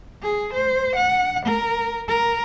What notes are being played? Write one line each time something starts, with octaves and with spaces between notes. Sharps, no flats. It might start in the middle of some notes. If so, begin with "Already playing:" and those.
G#4
C5
F#5
A#4
A#4